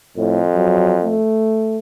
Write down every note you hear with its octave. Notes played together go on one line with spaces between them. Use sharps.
F2 A2
F#3
A3